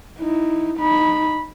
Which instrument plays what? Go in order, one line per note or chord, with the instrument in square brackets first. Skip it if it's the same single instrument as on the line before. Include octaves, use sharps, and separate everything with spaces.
[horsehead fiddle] D#4 E4
D#4 B5